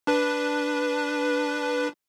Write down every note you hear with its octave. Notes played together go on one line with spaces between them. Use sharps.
D4 B4